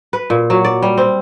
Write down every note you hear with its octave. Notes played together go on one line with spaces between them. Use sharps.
B4
A#2
F#3
D5
G3
C4